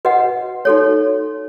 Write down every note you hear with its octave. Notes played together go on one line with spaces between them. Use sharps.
F#4 B4 D#5 F#5
D#4 F#4 A4 C#5